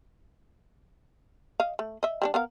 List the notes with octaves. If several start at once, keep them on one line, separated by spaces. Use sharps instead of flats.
D#5 F5
A3
D#5 E5
G3 A3 D4
B3 A#4 F5